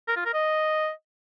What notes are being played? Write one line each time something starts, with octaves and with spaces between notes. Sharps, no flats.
A#4
F4
A#4
D#5